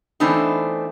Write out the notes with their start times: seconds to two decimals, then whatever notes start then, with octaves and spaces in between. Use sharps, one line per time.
0.20 E3 A3 B3 C4 D4 D#4